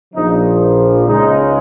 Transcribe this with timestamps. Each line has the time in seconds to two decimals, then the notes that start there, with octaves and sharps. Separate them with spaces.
0.13 A#1 A#2 F3 D#4
1.06 C#2 C#3 G#3 D#4